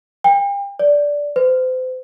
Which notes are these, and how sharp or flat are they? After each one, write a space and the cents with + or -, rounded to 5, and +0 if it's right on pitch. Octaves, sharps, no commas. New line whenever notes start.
G5 +40
D5 -10
C5 -35